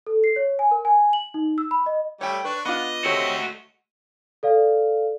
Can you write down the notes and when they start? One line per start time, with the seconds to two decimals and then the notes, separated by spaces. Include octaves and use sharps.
0.07 A4
0.24 C7
0.36 C#5
0.59 G#5
0.71 A#4
0.85 G#5
1.13 F#7
1.34 D#4
1.58 E6
1.71 B5
1.86 D#5
2.21 G3 A3 C#5 G5
2.45 D4 B4 C#6
2.65 B3 D4 F4 D#5
3.05 A3 C4 F#4 G4 C#5
4.43 A4 D5 F5